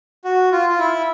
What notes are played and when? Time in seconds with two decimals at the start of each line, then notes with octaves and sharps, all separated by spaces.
0.25 F#4
0.52 F4
0.69 F4
0.79 E4